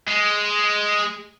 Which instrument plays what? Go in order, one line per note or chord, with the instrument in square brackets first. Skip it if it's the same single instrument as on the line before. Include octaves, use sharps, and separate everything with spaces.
[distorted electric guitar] G#3